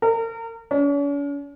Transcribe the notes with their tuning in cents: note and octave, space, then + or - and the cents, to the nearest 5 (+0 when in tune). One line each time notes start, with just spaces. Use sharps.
A#4 -35
C#4 +45